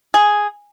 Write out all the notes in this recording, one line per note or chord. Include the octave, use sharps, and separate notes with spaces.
G#4